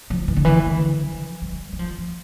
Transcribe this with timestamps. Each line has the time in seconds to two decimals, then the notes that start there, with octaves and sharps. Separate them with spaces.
0.10 F3
0.28 E3
0.37 D3
0.45 E3
0.66 D3
1.03 F3
1.42 G3
1.73 G3
1.79 F3
1.98 F3